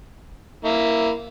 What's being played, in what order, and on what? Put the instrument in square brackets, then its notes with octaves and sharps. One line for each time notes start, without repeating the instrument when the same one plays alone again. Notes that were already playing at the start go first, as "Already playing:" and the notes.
[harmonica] A#3 E4